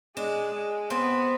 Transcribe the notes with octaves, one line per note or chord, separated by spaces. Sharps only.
G#3 D4
G#3
B3 C4